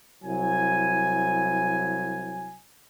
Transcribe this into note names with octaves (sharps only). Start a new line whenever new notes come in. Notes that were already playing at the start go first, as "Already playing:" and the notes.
C2 F#3 E4 G#5